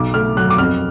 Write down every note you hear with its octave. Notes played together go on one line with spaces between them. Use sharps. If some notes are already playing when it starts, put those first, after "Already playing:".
Already playing: B1 D6
A3 F6
F#3 F#6
D6
F2 F6